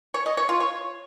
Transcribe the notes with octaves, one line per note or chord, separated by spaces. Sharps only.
C#5
D#5
C#5
F4
C#5